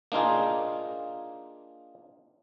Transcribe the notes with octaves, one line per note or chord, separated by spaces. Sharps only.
A#3 D4 D#4 F4 G#4